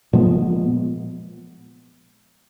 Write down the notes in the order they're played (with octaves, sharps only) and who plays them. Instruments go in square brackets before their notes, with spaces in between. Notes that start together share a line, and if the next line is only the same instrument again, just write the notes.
[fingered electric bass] A#2 F3 G#3 B3